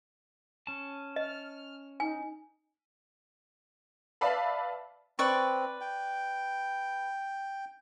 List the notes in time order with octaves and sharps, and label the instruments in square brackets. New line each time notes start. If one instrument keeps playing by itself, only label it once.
[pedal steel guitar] C#4 A5
[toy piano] D#5 [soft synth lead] F6
[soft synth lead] D#4 [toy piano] G#5
[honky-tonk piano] B4 D5 E5 F5 A5 B5
[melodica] C4 [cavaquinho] B4 D5 C#6
[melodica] G5